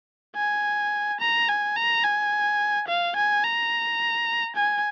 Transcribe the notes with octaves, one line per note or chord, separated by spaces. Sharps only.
G#5
A#5
G#5
A#5
G#5
F5
G#5
A#5
G#5